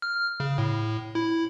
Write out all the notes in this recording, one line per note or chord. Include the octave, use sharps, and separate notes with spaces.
F6
C#3
A2
E4